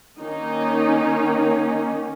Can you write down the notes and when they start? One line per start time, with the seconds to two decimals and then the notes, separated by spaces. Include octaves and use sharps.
0.19 D#3 A#3 C#4 D#4